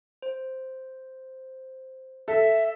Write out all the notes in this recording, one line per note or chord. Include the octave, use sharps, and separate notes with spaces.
C5
A4 E5